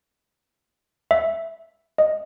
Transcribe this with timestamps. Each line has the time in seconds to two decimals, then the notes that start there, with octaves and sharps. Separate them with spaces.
1.11 E5
1.98 D#5